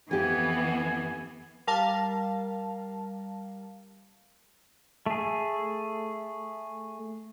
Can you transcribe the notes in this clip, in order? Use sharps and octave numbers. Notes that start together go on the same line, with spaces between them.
F2 E3 B3 G4 G#5
G3 A#4 F5 A5
A3 G#4